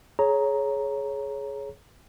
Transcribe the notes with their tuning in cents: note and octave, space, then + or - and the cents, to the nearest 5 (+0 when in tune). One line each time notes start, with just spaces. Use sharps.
G#4 +20 C#5 +0 A#5 +0